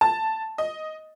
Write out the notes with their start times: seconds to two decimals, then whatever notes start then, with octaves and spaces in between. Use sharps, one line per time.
0.01 A5
0.58 D#5